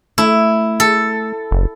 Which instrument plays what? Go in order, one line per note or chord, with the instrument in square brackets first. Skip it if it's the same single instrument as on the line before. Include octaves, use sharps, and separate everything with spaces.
[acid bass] A3 [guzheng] E4
[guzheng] A4
[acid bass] F#1